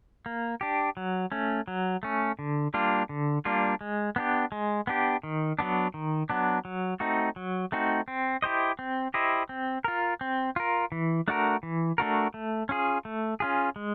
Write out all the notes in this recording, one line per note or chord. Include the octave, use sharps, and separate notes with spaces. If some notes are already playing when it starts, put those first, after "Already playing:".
A#3
D4 G4
F#3
A3 C#4
F#3
A3 C#4
D3
G3 A#3 D4 F4
D3
G3 A#3 D4 F4
G#3
B3 D4 G4
G#3
B3 D4 G4
D#3
F#3 B3 D4
D#3
F#3 B3 D4
F#3
A3 C4 D#4 F#4
F#3
A3 C4 D#4 F#4
C4
E4 G4 C5 D#5
C4
E4 G4 C5 D#5
C4
F4 A#4
C4
F4 A#4
E3
A3 D4 F#4 A#4
E3
A3 D4 F#4 A#4
A3
C#4 F4 G#4
A3
C#4 F4 G#4
G#3